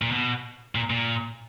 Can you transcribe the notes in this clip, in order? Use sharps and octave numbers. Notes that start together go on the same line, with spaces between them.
A#2
B2
A#2
A#2